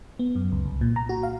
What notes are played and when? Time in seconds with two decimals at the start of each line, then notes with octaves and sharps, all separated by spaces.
0.19 B3
0.35 F#2
0.52 C#2
0.66 C2
0.81 A#2
0.96 A#5
1.09 F#4
1.23 F5